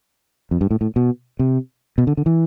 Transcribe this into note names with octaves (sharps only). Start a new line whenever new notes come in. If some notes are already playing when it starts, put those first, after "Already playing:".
F2
G2
A2
A2
B2
C3
B2
D3
D3
E3